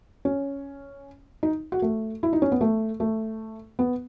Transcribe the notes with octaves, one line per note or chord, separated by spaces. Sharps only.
C#4
D#4
F#4
A3
E4
D#4
C#4
B3
A3
A3
B3